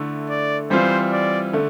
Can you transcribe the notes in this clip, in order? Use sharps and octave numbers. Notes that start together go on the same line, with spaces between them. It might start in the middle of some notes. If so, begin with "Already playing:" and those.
Already playing: D3 A3 E4
D5
E3 G3 C4 F4 C5
D5
D3 A3